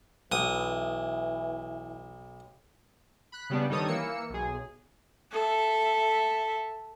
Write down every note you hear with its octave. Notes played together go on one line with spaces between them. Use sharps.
B1 E3 D#6
B5 F#6
C#3 G3 B3 D4
G2 D#3 G3 A4 C#5 D#6
E3 A#3 E6 C#7
B1 G#4
A4 E5